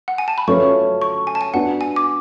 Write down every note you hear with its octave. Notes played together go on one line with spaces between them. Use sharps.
F#5
G#5
A5
B5
F#3 A3 C#4 F4 B4 C#6
C#6
G#5
A5
G#5
B3 D4 F#4 B4 F#5
G#5
D6